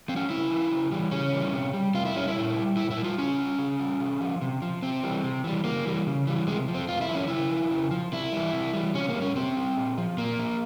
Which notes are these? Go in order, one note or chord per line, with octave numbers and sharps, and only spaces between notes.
F3 C4
C#4
C#3 E4
F3
C#3
E3 G3
C#3 C#4
E3 G3
C3
G3
C3 F4
E4
G3 C#4
E4
A#2
G3
A#2 E4
E4
G3
F4
C#3 C#4
G3
C#3
G3
C3
F3
C3
F3
C3 C4
E3 G3
C3
E3 G3
C#3 A#3
E3 G3
C#3
E3 G3
C3 G#3
F3
C4
C3 F4
E4
F3
C#4
C#3 E4
F3
C#3
F3
C3 E4
E3 G3
C3
E3 G3
C3 C#4
A#3
G3
C#4
C3 C4
G3
A#2
F3
A#2 A#3
F3